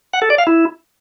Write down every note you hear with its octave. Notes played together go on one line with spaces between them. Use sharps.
F#5
A4
D5
F5
E4